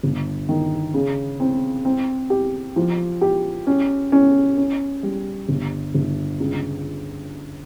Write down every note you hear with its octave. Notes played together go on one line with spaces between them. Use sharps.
G1
D#3
C#3
C4
C4
G4
F3
G4
C#4
C#4
C#4
G3
G1
G1
C#2